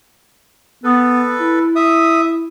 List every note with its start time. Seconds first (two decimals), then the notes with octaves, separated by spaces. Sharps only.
0.84 B3 A4 B4
1.40 E4
1.75 E5 D#6